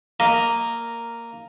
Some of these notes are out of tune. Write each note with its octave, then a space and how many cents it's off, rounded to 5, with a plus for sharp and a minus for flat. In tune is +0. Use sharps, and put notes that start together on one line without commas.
A#3 -5 A#4 +0 D#5 +0